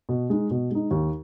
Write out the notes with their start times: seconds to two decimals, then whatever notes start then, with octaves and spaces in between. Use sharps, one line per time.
0.09 B2
0.30 G#3 D#4
0.51 B2
0.71 G#3 D#4
0.91 D#2